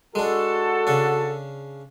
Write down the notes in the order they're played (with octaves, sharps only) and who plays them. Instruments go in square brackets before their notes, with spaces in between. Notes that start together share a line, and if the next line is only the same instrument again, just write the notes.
[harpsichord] G#3 D4 [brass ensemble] F#4 A4
[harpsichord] C#3 D4